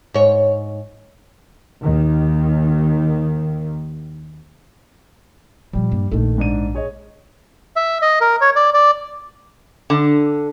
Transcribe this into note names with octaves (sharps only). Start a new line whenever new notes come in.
G#2 C#5
D#2 D#3
A#2 F3 G3
G2 A#3
A#1 A#2 D#3 A3
G#2 D4 D#7
G#4 C#5 D#5
E5
D#5
A#4
C#5
D5
D5
D3